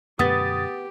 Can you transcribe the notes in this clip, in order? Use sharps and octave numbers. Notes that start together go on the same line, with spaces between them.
F#2 B2 D3 B3 G4 D#6 A6